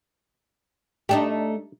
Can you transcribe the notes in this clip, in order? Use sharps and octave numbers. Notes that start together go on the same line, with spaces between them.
A3 D4 D#4 G4